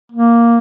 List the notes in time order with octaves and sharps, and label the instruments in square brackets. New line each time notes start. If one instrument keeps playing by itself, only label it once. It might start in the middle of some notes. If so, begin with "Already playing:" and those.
[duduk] A#3